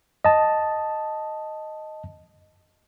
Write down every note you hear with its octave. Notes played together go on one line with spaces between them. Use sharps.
D#5 A5